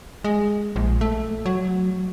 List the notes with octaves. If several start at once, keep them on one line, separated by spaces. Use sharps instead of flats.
G#3
A#1
A3
F#3